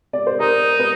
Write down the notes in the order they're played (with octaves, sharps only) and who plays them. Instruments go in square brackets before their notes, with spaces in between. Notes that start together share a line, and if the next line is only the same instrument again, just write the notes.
[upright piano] D5
C5
[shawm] D#4 [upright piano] A#4
[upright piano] B4